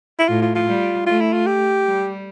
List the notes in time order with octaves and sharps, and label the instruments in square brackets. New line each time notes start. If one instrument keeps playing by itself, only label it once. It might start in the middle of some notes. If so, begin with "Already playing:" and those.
[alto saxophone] E4
[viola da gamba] A2 [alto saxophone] F4
[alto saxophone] F4
F4
[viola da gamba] G3
[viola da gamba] A3 [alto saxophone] F4
[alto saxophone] E4
F4
G4
[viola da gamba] G3